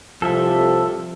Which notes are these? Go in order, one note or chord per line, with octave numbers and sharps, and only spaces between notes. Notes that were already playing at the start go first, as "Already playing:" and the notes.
C2 A2 C3 F3 A4 E5